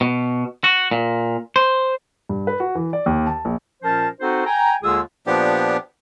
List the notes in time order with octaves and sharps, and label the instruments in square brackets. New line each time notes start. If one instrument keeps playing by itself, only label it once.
[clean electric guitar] B2
F#4
A#2
C5
[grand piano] G2
B4
F#4
E3
D5
D#2
A5
A#1
[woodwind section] A#2 F3 C#4 A#4 C5 A5
C4 D#4 F#4 A4 C5 F#5
G5 G#5 A#5
D#2 D3 G#3 F4 G#4 E6
[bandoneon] A#2 F3 B3 D4 G4